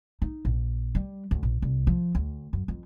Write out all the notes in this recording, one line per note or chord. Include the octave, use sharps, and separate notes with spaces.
D#4
A#1
G3
D2
A#1
C2
F3
D2
F#2
F2